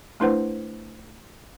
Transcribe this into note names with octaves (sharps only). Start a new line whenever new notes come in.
A3 D4 E4 B4 C5 F#5